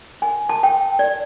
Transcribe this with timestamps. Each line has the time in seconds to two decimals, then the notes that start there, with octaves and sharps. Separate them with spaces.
0.22 G#5
0.49 A5
0.63 G5
0.99 D5